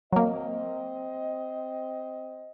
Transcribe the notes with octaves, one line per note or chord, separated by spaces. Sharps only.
F#3 A#3 C4 D#5